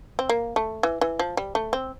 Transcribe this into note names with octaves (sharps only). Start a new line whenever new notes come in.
C4
A#3
A3
E3
E3
F3
G3
A3
C4